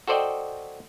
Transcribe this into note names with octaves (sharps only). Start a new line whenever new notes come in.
F#4 A4 C5 D5 D#5 G5